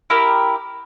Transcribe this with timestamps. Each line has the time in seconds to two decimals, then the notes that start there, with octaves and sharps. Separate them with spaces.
0.10 E4 G4 A#4